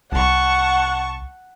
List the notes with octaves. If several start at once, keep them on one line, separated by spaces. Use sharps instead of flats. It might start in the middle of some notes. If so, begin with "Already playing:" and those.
C2 F#5 A5 C#6